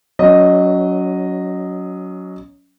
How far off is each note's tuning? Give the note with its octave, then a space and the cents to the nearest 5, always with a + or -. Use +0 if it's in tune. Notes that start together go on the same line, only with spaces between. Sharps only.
F#3 +0 C#4 +25 D#5 -5